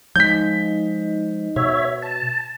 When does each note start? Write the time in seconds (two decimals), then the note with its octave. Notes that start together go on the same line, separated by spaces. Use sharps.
0.16 F3 G#3 D#4 D#5 G6 B6
1.56 B2 C#5 E5
2.02 A5